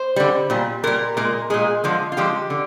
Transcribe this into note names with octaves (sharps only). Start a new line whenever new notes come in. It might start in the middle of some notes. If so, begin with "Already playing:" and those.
Already playing: C5
D3 G3
A#2 G3
A#2 G3 A#4
A#2 G#3 A#4
A#2 G#3 G#4
D3 F3 G#3
F4
D3 F3 G#3 G4
D3